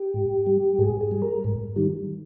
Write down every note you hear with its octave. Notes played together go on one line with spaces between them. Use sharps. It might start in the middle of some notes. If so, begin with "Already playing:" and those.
Already playing: G4
G#2
G3
G#2 G#4
G#4
G3
A#4
G#2
D#3 G3